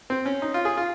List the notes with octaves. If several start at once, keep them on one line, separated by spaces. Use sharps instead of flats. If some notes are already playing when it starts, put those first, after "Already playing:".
C4
C#4
D#4
F4
G#4
F4